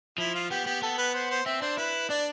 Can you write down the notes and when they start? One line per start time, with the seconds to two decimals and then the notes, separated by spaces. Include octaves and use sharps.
0.18 F3 E4
0.34 F4
0.50 B3 G4
0.66 B3 G4
0.82 B3 A4
0.98 B4
1.14 C5
1.30 C5
1.46 C4 E5
1.62 D4 C5
1.77 E4 B4
2.10 D4 D5